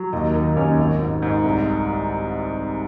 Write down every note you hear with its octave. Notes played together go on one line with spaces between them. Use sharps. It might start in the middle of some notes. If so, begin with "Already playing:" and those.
Already playing: F#3
D#2 D#4 D#5
D#3 D#4 D#5
D#2 C#4 C#5
G#1
G#2
G#2
C2